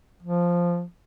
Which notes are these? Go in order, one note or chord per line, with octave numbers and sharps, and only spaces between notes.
F3